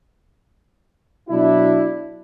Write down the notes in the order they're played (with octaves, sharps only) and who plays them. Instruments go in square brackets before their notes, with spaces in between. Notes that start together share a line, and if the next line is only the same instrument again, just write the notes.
[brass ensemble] B2 F#3 D4 E4